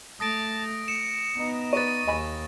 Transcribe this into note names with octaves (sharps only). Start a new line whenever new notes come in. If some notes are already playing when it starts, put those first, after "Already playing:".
A3 A5 D#6 A#6 D7
C#7 E7
B3 D#4
B4 D5 C#6 A6 D#7
D#2 D#5 G#5 B5